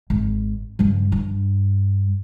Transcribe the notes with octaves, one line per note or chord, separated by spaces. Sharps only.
G#1
G2 C#3
G2